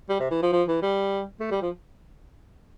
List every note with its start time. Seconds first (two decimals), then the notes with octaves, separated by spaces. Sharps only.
0.10 G3
0.20 C3
0.31 E3
0.43 F3
0.53 F3
0.68 E3
0.82 G3
1.40 A3
1.51 G3
1.62 F3